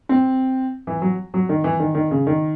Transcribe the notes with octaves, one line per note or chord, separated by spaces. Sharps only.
C4
E3
F#3
F#3
D#3
E3
D#3
D#3
C#3
D#3